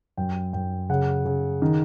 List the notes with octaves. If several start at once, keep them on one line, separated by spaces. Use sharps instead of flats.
F#2 G5
F#2 G5
C#3 F#5
C#3
D#3